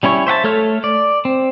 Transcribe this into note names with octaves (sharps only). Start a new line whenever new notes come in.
G3 C#4 E4 C#5
C5 E5 F#5 A5
A3 A4 C#5 F6
D5
C4